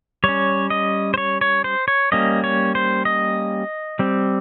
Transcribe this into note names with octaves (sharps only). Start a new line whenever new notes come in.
G3 C#4 C#5
D#5
C5
C#5
C#5
C5
C#5
G3 A#3 C#4 D#5
C#5
C5
D#5
G3 C4